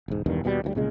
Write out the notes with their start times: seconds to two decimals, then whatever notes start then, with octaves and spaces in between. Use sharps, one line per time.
0.08 E1 G#2
0.26 E1 E2 G2 D#3
0.44 D#2 B2 E3 G3
0.64 D2 E3 G3
0.75 C2 A#2 C#3 G#3